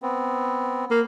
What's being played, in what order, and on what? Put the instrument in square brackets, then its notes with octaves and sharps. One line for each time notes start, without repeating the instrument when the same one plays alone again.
[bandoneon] B3 C4
[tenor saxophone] A#3